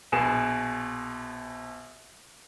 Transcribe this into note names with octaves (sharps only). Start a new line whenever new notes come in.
A#1 B2 G#4 E7